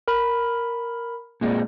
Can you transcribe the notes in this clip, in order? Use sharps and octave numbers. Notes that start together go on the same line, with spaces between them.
A#4 B5
A#2 G#3 C4